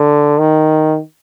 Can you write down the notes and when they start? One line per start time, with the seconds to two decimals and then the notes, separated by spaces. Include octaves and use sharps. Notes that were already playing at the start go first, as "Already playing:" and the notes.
Already playing: D3
0.38 D#3